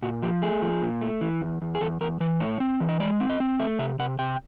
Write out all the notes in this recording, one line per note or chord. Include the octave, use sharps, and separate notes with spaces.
A#2 F#4
F3 G4
A3 G#4
F3
A#2
A3
E3
E2
E2
G#4
E2 A4
E2 A#4
E3 B4
A2 C#5
C4
E3
D#5
G#3 D5
C4
D#5
C4
A3 E5
C3 E5
C3 F#5
C3 G5